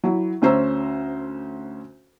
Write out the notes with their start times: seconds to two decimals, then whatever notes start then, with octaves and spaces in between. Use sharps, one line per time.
0.04 F#3 E4
0.42 D2 C#4 C5 A#5 E6